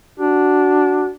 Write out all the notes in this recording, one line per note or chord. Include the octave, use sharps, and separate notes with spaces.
D4 F#4